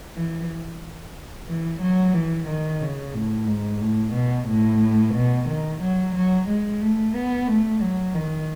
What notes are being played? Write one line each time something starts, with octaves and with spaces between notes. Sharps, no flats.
E3
E3
F#3
E3
D#3
C#3
A2
G#2
A2
B2
A2
B2
D#3
F#3
F#3
G#3
A3
B3
A3
F#3
D#3